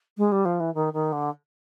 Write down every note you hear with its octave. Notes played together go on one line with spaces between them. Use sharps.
G#3
G3
F3
E3
D#3
D#3
D3